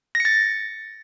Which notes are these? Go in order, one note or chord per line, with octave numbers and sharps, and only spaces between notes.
A#6
C#7
A6